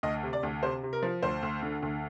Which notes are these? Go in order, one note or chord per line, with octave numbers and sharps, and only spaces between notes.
D2 D#5
C3
D5
D2
C3 C5
C3
A#4
F3
D2 C5
D2
D3
D2